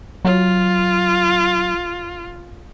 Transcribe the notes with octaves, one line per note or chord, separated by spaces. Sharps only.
F#3 F4